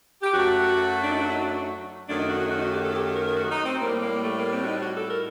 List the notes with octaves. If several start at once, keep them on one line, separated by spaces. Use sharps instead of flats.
G4
F#2 F#3 A3 F#4
D4
D#4
F#4
D#4
D4
F#2 D#3 A3 D4
D#4
F#4
F#4
D#4
F#4
D#4
F#4
G4
A4
G4
A#4
A#4
F#4
D#4
C4
A2 G3 A#3
A#3
A3
A#3
C4
F#4
D#4
F#4
A4
A#4